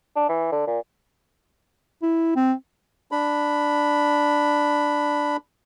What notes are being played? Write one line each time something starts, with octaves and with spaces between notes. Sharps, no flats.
D4
E3
D3
A#2
E4
C4
D4 B5